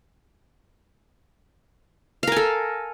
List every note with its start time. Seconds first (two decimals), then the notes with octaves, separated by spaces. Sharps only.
2.23 F5
2.27 A#4
2.32 G#5
2.36 A4